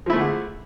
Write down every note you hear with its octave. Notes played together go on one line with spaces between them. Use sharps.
D3 F3 A3 E4 G#4